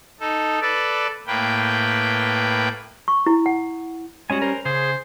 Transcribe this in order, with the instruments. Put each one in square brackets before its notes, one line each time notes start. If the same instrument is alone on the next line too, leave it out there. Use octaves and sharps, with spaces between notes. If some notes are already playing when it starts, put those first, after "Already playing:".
[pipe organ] D#4 A4
A4 B4 D5
A2 A#3 B4 G5
[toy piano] C#6
E4
F#5
[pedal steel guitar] G3 C#4 G#5 [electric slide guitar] G#3 F#4
[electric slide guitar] A#4 C5
[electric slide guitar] C#3 [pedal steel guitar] G#4 [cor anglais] C5